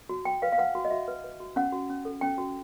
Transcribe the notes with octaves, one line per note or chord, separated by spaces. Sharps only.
F#4
F#4 G5
B4 F5
F5
B4 F#5
F#4
D#5
F#4 E5
B4
B4
F#4
C#4 F#5
F#4
C#4
A4
C#4 G5
F#4